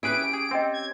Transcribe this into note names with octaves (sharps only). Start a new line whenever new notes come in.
C#4 E4 G4 G#4 B4 D7
G#4
C4 D#5 G5 E6
G#6